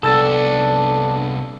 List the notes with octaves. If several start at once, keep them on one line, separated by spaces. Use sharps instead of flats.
C2 B3 D4 A4 E6 A6